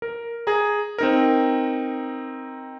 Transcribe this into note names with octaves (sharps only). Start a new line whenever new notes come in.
A#4
G#4 A#5
C4 D#4 A#4